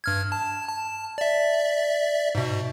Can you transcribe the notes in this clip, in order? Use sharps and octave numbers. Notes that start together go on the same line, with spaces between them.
G2 F6 G#6
A5
A5
D5 E5
G#2 B2